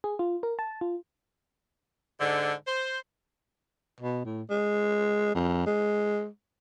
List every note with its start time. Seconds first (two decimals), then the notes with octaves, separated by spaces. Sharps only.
0.04 G#4
0.19 F4
0.43 A#4
0.59 A5
0.81 F4
2.20 G#2 D3
2.66 C5
4.00 B2
4.25 A2
4.50 G#3
5.34 F2
5.66 G#3